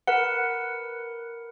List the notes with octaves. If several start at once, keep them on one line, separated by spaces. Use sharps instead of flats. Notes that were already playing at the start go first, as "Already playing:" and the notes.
A#4 B4 F#5